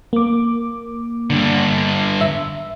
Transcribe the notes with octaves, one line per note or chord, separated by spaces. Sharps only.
A#3 D6
G2 D3
E5